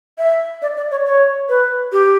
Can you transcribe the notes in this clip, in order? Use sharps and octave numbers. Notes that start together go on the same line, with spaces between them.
E5
D5
D5
C#5
C#5
B4
G4